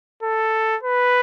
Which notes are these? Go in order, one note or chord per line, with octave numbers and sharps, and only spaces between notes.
A4
B4